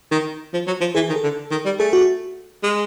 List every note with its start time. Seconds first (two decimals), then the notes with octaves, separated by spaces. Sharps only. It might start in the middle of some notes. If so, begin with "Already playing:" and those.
0.11 D#3
0.54 F3
0.67 F#3
0.81 F3
0.95 E3 G#4
1.09 D#3
1.16 A4
1.23 D3
1.51 D#3
1.65 G3
1.79 A3 G#4
1.93 F#4
2.63 G#3